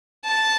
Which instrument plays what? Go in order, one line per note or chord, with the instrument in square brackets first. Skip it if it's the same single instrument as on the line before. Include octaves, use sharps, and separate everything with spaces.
[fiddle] A5